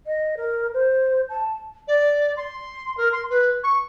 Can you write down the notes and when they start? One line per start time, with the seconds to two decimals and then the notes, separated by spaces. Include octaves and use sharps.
0.07 D#5
0.37 A#4
0.74 C5
1.29 A5
1.88 D5
2.37 C6
2.97 A#4
3.12 C6
3.30 B4
3.63 C#6